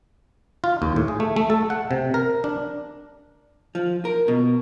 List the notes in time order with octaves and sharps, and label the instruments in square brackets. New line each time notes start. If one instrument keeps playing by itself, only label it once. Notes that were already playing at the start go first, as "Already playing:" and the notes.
[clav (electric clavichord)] F4
D#2
A2
G#4
A3
A3
A4
F#5
C3
A#4
D4
[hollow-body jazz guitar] F3
A#4
B2